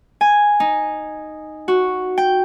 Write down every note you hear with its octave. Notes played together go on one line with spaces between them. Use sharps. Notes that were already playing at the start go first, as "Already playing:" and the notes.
G#5
D#4
F#4
G5